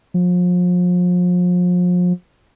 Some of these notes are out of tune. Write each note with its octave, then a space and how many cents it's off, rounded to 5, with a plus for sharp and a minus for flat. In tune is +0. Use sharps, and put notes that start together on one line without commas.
F3 +35